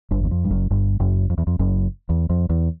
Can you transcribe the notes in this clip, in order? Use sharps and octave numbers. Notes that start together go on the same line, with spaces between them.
G1 G2
E2
F2
G2
F#1 F#2
G1 G2
F#1 F#2
F2
E2
F2
F#1 F#2
E2
F2
E2